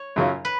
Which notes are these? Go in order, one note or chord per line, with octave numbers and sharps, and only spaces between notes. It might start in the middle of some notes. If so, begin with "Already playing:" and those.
Already playing: C#5
F#2 C#3 F#3 C#4 F4
B4